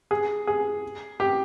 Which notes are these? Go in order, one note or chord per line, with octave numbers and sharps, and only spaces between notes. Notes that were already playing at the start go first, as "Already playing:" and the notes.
G#4
G#4
G4